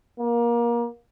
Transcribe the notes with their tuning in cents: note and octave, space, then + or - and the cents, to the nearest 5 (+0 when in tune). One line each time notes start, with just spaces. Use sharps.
A#3 +25